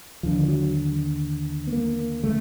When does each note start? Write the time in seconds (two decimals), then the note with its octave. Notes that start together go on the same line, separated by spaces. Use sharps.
0.23 D#2 D3 F3
0.48 F#3
1.67 B3
1.73 A#3
2.23 C#3 A3